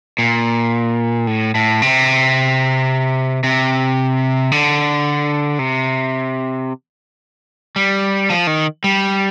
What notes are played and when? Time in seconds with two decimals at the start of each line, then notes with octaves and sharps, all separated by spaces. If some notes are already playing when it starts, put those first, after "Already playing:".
0.19 A#2
1.27 A2
1.55 A2
1.82 C3
3.44 C3
4.52 D3
5.59 C3
7.76 G3
8.30 F3
8.47 D#3
8.84 G3